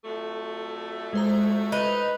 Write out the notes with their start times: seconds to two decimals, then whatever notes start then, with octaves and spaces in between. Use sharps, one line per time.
0.04 F2 F#3 A3
1.13 G#3 C5 A#5
1.72 D#4 B4